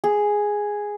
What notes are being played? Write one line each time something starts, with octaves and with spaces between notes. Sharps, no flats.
G#4